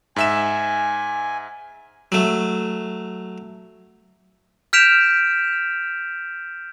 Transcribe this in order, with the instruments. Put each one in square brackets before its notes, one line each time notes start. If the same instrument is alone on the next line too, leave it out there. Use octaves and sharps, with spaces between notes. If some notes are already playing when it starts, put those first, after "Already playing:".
[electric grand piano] G#2 E5 E7 [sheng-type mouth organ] G#5
[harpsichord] F#3 A3
[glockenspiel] F6 G6 B6 D7 E7 F7